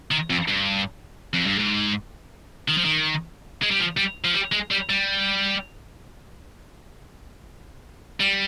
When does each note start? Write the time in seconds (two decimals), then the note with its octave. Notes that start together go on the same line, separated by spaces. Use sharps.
0.11 D#3
0.30 F2
0.48 G2
1.33 F2
1.46 G2
1.59 G#2
2.68 D#3
2.77 F3
2.85 D#3
3.62 G#3
3.71 G3
3.79 F3
3.97 G3
4.25 F3
4.34 G3
4.52 G#3
4.71 G3
4.90 G3
8.20 G3